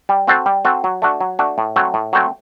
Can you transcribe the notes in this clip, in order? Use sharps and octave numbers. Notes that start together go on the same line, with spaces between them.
G3
C4 F#4 A4 C5
G3
C4 F#4 A4 C5
F#3
A3 D4 F#4
F#3
A3 D4 F#4
A2
F#3 A3 C4
A2
F#3 A3 C4